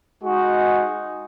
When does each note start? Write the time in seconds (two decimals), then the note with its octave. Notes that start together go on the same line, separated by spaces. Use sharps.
0.23 G#3 D#4 F#4